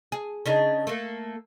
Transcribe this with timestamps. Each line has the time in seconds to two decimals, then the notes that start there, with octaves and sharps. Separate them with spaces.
0.12 G#4
0.46 C#3 D4 D#4
0.87 A3 A#3